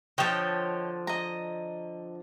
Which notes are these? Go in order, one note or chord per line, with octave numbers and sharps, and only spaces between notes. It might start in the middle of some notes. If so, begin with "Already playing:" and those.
D3 F3 C#5 D#5 G5
D#5 A#5